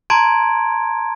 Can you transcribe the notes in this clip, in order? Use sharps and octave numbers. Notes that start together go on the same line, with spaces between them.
A5 A#5 C6 G#6 D7